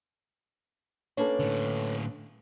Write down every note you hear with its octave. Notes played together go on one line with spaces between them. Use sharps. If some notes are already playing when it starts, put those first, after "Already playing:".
A#3 C#4 D4 A4 B4 C#5
A2 D3